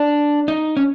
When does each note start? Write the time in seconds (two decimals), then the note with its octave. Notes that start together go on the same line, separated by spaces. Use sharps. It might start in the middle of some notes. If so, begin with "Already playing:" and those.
Already playing: D4
0.48 D#4
0.77 C#4